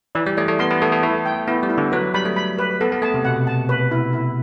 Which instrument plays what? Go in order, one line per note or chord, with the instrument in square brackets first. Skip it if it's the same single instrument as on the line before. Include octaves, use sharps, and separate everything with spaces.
[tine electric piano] E3 [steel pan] D5
[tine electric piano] G3
[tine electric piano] A3 [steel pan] D5
[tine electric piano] A3
[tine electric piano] B3 [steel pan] C6
[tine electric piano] B3
[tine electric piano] A3 [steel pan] A4
[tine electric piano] A3
[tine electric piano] A3 [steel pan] E4
[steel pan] G5
[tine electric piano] B3 [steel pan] E4
[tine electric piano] G3
[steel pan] E4
[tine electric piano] D3
[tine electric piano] F#3 [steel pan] B4
[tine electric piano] G3 [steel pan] B5
[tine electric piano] A3
[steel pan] B5
B4
[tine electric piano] B3 [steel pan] A4
[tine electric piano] B3
[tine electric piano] A3 [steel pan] A5
[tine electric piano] C3
[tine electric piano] B2 [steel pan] F#5
[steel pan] A5
B4
E4
E4